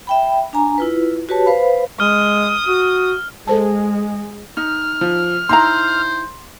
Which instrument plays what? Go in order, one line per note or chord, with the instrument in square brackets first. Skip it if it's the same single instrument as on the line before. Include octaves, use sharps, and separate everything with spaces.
[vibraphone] E5 G5 B5
D4 G#5 A#5
E4 F4 B4
F#4 G4 B4 C#5 A5
B4 C5 F5 B5
[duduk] G#3 [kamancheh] D#6 [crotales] F6
[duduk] F#4
[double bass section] G#3 [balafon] A4 C5 A5
[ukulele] D#4 [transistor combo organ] F6
[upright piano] F3
[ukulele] D#4 E4 A#5 [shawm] C5 [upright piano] C6